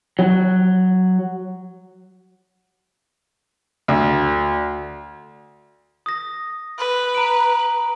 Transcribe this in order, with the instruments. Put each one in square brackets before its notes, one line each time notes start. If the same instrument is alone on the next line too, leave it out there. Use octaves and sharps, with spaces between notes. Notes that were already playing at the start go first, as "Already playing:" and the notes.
[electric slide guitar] F#3
[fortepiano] D2
[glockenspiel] D#6 A#6
[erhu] B4
[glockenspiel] A#5 D7